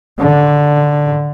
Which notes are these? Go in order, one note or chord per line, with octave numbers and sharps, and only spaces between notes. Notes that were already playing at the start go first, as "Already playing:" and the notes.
D3